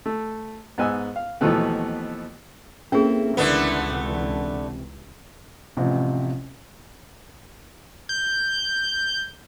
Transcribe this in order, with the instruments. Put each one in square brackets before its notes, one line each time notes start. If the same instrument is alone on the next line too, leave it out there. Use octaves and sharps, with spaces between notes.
[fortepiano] A3
G#2 B3 D#5 G#5 E6
F5
D#2 B2 E3 F3 A3 B3
[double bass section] A#3 [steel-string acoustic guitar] C4 E4 A4 [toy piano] C#4 G#4
[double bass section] C#2 E3 [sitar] D3 A3 B3 [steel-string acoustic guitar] E4 A#4
[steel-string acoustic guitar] C3
[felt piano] A1 C3 F3
[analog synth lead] G6